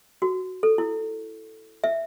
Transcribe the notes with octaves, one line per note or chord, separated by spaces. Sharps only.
F#4
A4
E4
E5